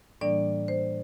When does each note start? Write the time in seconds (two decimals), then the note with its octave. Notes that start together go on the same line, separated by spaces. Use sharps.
0.21 A2 E3 G3 A#3 D4 D5
0.68 C5